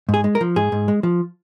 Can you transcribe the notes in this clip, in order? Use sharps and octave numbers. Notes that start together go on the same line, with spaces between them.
G#2
G#4
G#3
A#4
F3
G#2 G#4
G#2
G#3
F3